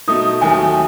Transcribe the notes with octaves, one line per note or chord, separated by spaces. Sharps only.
B2 A3 D#4 D#6
D#2 D#3 F#3 A3 G#5